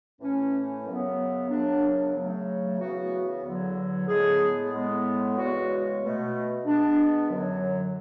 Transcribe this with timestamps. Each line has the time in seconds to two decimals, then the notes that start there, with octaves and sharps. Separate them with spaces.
0.20 A2 E3 A3 C#4
0.85 F#2 C#3 F#3 B3
1.49 F#2 C#3 F#3 B3 D4
2.14 C#3 F#3 A3
2.79 C#3 E3 B3 F#4
3.43 E2 D3 F#3
4.07 A2 G#3 B3 G#4
4.71 A2 G#3 B3
5.35 E2 C#3 G#3 B3 F#4
6.00 B2 A3
6.65 B2 G#3 B3 D4
7.29 F#2 D3 F#3